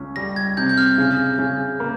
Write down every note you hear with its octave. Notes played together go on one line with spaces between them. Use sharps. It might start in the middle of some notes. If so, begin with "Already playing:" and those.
Already playing: C#2 C#4
G3 A#6
G#6
C3 G6
G6
F6
C#3
C#3
A#3